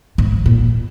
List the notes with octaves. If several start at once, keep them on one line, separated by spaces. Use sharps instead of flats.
G#2
A#2